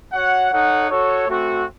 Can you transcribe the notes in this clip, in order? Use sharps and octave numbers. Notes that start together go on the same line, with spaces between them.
F#4 C#5 F#5
D#4 A4 C#5 F#5
F#4 A4 C#5
A3 C4 F#4